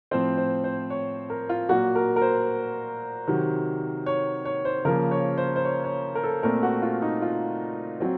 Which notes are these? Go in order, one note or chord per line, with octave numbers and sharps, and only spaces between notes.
A2 F3 C4 C5
C5
C5
C#5
A#4
F4
A#2 F#3 A#3 F#4
A#4
A#4
C5
C3 D#3 F#3
C#5
C#5
C5
C#3 F3 A#3 A#4
C#5
C5
C5
C#5
C#5
A#4
A4
A#2 A3 C4 A#4
F#4
F4
D#4
F4
F#3 C4